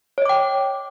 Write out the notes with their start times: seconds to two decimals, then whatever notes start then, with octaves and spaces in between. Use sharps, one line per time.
0.18 C#5
0.22 D#5
0.26 D6
0.29 G5